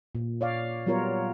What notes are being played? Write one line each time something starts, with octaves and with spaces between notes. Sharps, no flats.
A#2
C#5 D5 F5
F#3 G3 B3 F4 A#4 C#5